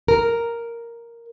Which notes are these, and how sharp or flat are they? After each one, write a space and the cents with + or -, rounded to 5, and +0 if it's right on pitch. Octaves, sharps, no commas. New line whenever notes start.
A#4 +0